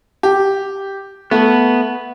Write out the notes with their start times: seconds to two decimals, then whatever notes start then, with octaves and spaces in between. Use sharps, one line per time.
0.23 G4
1.31 A3 B3